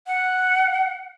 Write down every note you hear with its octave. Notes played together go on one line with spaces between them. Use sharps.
F#5